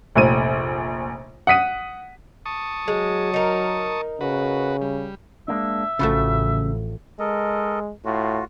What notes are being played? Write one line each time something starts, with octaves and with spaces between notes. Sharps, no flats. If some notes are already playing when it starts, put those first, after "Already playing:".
F1 A#1 D#7
F#5 D#6 B6 D#7
A5 C#6 D#6
F#3 G#3
D#4 A#4
C#3 F#4 B4
G3
G#3 A#3 D4 E5
A1 C#3 F3 F#3 A3
G#3 A4 A#4 D#5
A2 F4 F#4